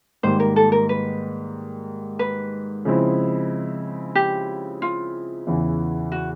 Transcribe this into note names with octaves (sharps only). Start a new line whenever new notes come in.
G#2 D#3 G3 A#3 C5
A#4
A4
A#4
B4
B4
C#3 F3 G#3 C4 E4
G4
F4
E2 C#3 E3
F#4